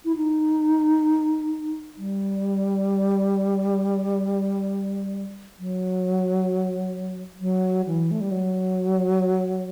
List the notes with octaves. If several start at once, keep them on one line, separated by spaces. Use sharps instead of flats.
E4
D#4
G3
F#3
F#3
E3
A3
G3
F#3